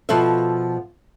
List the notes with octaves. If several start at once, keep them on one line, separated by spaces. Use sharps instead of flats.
B2 F3 F#4 A4 E5